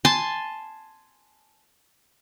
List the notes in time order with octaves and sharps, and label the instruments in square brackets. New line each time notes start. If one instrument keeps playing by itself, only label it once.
[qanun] G#5 A5 C6